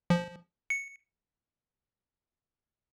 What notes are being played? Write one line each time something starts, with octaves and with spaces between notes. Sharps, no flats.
F3
C#7